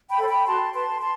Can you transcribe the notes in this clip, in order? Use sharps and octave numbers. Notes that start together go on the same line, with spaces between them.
G5 B5
A4 C5
G5 B5
F#4 A5 C6
B4 A5 C6
A5 C6